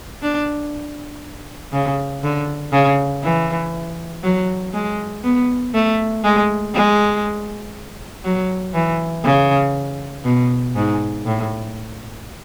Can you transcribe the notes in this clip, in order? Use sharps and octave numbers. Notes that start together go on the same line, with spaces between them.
D4
C#3
D3
C#3
E3
F#3
G#3
B3
A3
G#3
G#3
F#3
E3
C#3
B2
G#2
A2